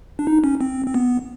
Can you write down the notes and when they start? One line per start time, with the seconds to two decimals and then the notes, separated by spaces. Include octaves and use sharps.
0.19 D4
0.27 D#4
0.44 C#4
0.61 C4
0.86 C4
0.94 B3